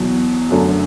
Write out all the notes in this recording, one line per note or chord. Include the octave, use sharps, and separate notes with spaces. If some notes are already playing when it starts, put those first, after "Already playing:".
Already playing: E2 B2 F#3
F#2 D3 F#3 A3 D4